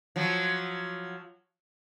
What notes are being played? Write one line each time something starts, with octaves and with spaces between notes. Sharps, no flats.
F3 F#3